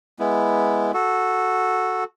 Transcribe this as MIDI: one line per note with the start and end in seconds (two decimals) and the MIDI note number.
0.19 0.91 56
0.19 0.91 59
0.19 0.91 64
0.94 2.04 66
0.94 2.04 69